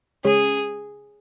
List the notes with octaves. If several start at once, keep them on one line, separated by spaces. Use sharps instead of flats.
C#3 G#3 C#4 G#4